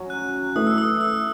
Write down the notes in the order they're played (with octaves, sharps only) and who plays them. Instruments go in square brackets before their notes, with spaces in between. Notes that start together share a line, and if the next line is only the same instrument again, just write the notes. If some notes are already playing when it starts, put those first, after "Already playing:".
Already playing: [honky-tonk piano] F#3 C#4 F#4
[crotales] F#6
[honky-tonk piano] A3 E4 B4 E5 [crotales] D#6
[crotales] E6
D#6
E6